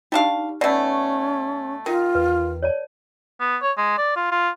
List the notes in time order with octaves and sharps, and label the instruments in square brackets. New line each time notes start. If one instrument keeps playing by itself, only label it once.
[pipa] G3 D4 F5 [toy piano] D#4 G4
[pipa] B2 A3 [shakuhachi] C#4 [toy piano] D5
[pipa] D#3 [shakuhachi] F4 [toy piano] A#4
[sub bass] E2 [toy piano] B4
[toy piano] C#5 D5 A5
[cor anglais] B3
C#5
G#3
D5
F4
F4